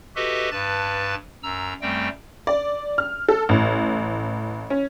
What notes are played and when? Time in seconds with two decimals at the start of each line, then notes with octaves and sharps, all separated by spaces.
0.16 F#4 G4 A4 B4 D#5 E5
0.52 G2 B4 A5 F#6 A6
1.43 F#2 A#5 E6
1.82 F#2 G3 A3 C4 G5
2.47 D5
2.98 F6
3.28 A4
3.49 A1
4.70 C#4